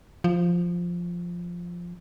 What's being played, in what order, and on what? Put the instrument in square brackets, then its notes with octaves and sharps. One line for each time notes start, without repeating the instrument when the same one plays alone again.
[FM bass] F3